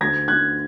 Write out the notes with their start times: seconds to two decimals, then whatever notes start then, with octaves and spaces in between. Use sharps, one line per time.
0.01 D2 G#6 A#6
0.28 D2 F#6 G#6